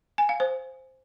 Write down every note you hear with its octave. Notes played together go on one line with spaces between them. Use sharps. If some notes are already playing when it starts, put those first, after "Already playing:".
G#5
F5
C5